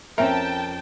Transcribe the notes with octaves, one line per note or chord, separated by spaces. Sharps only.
F2 C4 C#4 A#4 E5 G5 A5